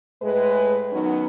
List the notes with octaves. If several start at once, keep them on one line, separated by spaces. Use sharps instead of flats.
A2 G#3 B4
D#3 F#3 B3 C#4 D#4